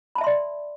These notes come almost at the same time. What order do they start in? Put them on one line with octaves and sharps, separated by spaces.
B5 A5 E5 C6 D5